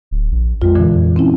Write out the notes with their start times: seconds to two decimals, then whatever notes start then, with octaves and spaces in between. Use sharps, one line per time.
0.11 D1
0.31 A#1
0.62 F2 G#3 F4
0.75 A#2 D3 E3
0.95 F2
1.16 C4 C#4 E4